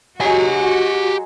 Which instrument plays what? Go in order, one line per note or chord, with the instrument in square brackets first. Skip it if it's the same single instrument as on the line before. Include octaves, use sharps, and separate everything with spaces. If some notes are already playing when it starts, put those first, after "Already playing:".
[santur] F#3 G#3 [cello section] F#4 [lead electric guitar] G4 G#5